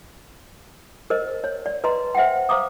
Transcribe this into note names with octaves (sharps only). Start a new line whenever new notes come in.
A#4 C5 D#5
C#5
D5
B4 D#5 A#5 C6
C5 E5 F#5 G5
C5 F5 A#5 D6 D#6